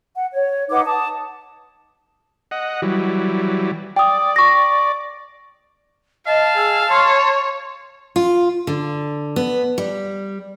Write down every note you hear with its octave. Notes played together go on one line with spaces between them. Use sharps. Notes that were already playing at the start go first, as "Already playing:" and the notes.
F#5
C#5
D#4 B4 F#5 D6
A5 D6 D#6
D#5 F#5
E3 F#3 G3
D5 G5 D#6
C#6 A#6
D#5 F5 A5
G#4 E6
C#5 C6
F4
D3
B3
G3